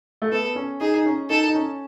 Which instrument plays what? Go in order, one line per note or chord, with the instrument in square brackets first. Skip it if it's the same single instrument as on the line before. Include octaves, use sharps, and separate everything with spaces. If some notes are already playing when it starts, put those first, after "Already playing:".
[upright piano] A3
[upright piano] B3 [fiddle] A4
[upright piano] C#4
[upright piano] D#4 [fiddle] G#4
[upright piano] D#4
C#4
[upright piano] D#4 [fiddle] A4
[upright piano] D#4
C#4